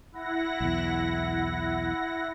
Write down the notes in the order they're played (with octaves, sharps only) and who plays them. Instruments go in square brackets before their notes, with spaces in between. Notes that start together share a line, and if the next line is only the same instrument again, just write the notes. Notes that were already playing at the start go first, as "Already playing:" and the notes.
[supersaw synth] E4 F#5 A#6
[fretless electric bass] B1 E2